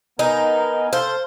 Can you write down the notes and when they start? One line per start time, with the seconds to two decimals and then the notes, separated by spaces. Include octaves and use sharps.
0.19 B3 D#4 A#4 G#5
0.93 A4 C5 F5